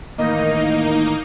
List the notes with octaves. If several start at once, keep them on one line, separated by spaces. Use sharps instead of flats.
A2 D#3 E3 A#3 D#4 D#5